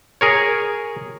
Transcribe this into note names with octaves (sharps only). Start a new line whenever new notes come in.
G#4 A#4 C#5